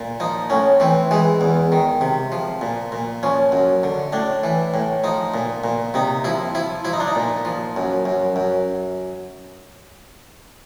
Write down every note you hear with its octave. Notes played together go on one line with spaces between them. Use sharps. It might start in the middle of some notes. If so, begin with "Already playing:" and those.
Already playing: A#2
F3 D#4
A2 C#4
E3 C4
E3 G#3
E2
D#3
C3
F3
A#2
A#2
F3 C#4
F#2
D3
A2 D4
E3
A2
F3 D#4
A#2
A#2
C3 D#4
F3 E4
F3 E4
F3 E4
D#4
D4
D#4
A#2
F3
F#2
F#2
F#2